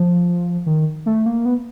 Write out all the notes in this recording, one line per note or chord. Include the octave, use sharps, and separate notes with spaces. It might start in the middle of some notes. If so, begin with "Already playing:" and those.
Already playing: F3
D#3
A3
A#3
B3